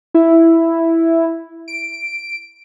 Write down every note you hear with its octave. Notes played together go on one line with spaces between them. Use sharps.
E4
D7